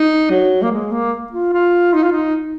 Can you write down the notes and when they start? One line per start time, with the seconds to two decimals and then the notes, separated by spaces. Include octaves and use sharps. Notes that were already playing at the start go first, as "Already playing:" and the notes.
Already playing: D#4
0.30 F#3
0.63 A#3
0.71 G#3
0.92 A#3
1.32 F4
1.53 F4
1.94 D#4
2.03 F4
2.12 D#4